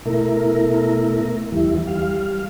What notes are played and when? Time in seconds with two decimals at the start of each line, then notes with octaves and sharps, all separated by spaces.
0.06 B2 A3 E4 A#4
1.52 E2 E3 G3 E4
1.87 G3 F5